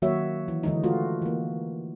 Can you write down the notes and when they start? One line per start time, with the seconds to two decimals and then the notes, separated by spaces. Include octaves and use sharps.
0.02 D#3 F#3 A#3 F#4 C#5 E5
0.48 E3
0.63 D3 E3 G#3 D#4
0.83 A3 F4 F#4
1.22 E3 A#3